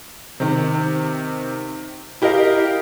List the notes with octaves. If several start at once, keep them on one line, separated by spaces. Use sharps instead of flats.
C3 D#3
E4 G4 A#4 D#5 F5